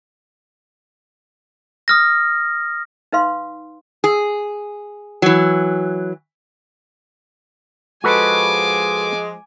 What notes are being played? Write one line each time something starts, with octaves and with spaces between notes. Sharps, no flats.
D#6 F6 A#6
D#4 B4 F5 C6
G#4
E3 F#3
F3 G#3 F#4 A4 B4 G#5 D6